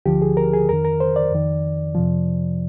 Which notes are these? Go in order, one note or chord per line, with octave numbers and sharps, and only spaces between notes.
D2 D3 F3 G4
G#4
A#4
G#4
F2 D#3 A#4
A#4
C5
D5
F2 D#3
F2 C3 F3